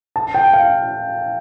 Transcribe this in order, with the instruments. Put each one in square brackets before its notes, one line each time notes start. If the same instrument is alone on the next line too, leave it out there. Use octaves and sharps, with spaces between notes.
[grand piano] A5
G5
F5